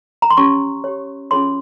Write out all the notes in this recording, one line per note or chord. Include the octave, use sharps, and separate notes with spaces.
A#5
C6
C#4 G4 C#5 C#6
G4 C#5
C#4 F4 G#4 C#5 C6